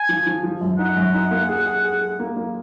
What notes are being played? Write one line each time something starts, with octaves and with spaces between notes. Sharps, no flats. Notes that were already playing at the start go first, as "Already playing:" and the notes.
Already playing: G#5
F3
F3
F3
F#2
D#4 F#5
F#2
D#4
A#3
G#4
G#4
G#4
G#4
A#3
A#3